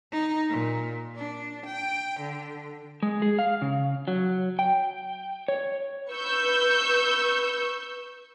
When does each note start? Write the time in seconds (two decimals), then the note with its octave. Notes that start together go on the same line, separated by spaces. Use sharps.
0.12 D#4
0.50 A#2
1.15 D4
1.66 G5
2.20 D3
3.03 G#3
3.22 G#4
3.39 F5
3.62 C#3
4.08 F#3
4.59 G5
5.48 C#5
6.10 B4 C#6 E6 G6